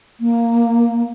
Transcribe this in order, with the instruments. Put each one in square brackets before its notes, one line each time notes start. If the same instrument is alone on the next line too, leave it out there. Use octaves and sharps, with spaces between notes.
[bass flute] A#3